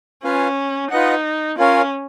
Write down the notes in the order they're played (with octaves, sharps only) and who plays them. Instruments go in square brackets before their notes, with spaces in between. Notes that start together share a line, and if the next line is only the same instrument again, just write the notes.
[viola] C#4 [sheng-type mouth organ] F4 B4 F5 G#5
[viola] D#4 [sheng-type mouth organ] F4 B4 D#5 F#5
[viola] C#4 [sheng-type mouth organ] F4 A#4 C#5 F5 G#5